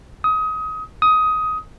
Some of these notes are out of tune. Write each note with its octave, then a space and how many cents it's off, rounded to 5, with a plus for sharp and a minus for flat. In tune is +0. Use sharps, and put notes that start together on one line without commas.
D#6 +25
D#6 +15